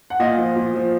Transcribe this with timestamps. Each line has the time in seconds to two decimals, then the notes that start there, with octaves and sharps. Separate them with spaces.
0.10 F#5
0.19 A#2 D#5 F5
0.38 F3
0.56 A#2
0.75 F3